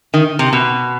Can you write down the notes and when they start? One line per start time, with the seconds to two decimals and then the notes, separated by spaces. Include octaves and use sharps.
0.14 D#3
0.39 C3
0.53 B2